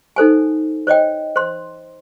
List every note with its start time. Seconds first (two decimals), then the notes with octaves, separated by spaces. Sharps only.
0.16 D#4 A4 C5 G#5
0.87 C5 C#5 D#5 G5
1.36 C5 C6